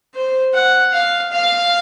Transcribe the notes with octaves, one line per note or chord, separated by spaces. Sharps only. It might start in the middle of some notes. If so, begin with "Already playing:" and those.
C5
F#5
F5
F5